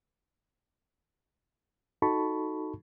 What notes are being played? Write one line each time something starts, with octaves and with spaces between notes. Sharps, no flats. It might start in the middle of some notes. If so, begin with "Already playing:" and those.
D#4 F#4 A4 A5 B5 C#6